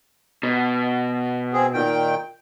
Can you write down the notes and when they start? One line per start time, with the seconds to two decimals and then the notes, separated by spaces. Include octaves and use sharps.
0.43 B2
1.53 C4 G#4
1.73 A#2 D#3 G5